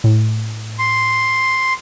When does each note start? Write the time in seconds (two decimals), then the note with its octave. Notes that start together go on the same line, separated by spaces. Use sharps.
0.04 A2
0.79 C6